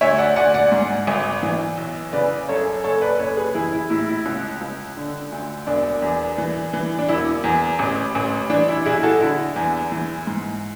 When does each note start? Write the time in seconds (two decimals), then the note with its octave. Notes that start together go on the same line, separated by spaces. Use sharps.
0.01 D2 C#5 E5
0.18 D5 F#5
0.36 D2 D5 F#5
0.54 D5 F#5
0.72 G#2
1.07 G#1
1.43 E3
1.77 B1
2.13 C#3 B4 D5
2.49 F#2 A4 C#5
2.84 F#1 A4 C#5
3.01 B4 D5
3.19 F#1 A4 C#5
3.37 G#4 B4
3.55 E3 E4 G#4
3.73 E4
3.90 A2 E4
4.08 E4
4.25 C#2
4.61 C#2
4.97 D3
5.32 D2
5.67 E1 D4
6.02 E2
6.38 E3
6.73 E3
6.99 D4
7.08 E1 E4
7.44 E2
7.79 A1
8.15 A1
8.50 E3 D4
8.68 E4
8.86 B1 E4 G#4
9.03 F#4 A4
9.20 D3 E4
9.56 E2
9.92 E3
10.27 G#2